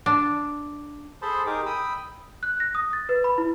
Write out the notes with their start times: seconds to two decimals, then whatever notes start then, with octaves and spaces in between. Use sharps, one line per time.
0.06 D4
1.22 G#4 A4 C5 A5 B5 C6
1.46 D#4 G4 G#4 A#4 D6
1.66 G5 B5 D#6 E6
2.43 F#6
2.60 A#6
2.75 D#6
2.93 A6
3.09 B4
3.24 B5
3.38 E4